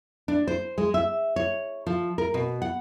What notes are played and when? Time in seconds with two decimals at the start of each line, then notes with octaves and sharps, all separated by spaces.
0.28 D4
0.47 C5
0.78 G#3
0.94 E5
1.36 C#5
1.86 F3
2.18 A#4
2.34 B2
2.62 F#5